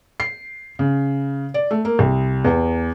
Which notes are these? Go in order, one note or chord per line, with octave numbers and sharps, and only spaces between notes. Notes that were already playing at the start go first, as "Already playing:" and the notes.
C7
C#3
D5
A3
A#3
C2
E2